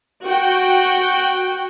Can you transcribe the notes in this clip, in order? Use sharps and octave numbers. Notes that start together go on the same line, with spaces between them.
F#4 G5